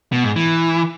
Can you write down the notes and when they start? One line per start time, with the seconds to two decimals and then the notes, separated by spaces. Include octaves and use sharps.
0.12 B2
0.24 G#2
0.36 E3